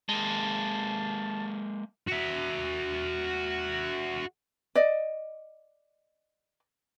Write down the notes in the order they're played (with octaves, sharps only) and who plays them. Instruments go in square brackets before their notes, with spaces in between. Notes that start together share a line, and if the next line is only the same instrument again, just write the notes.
[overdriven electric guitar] G#3 A#3 [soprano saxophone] A5
[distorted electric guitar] F#4 E5
[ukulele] D5 D#5